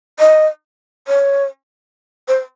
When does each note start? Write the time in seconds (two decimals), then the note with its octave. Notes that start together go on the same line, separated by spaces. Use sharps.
0.19 D#5
1.08 C#5
2.28 C5